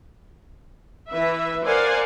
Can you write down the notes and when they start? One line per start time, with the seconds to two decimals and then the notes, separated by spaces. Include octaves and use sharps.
1.11 E3 B4 E5
1.64 A#4 C5 D5 F5 F#5 G#5